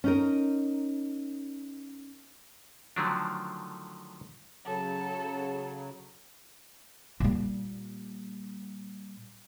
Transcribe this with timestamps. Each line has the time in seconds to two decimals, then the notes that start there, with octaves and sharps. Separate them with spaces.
0.04 C#4 D#4 A#4
2.96 D3 D#3 F3 F#3 A3 D4
4.66 C#3 F#3 A4
7.20 A#2 G3